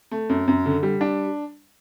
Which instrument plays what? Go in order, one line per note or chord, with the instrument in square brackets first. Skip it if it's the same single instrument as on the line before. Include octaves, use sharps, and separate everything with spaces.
[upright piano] A3
F#2
F#2
D3
G3
D4